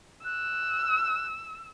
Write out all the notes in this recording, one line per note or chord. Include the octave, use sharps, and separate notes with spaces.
E6 F#6